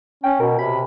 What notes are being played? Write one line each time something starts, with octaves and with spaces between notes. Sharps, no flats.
C#4 G5
B2 A#4
C3 B5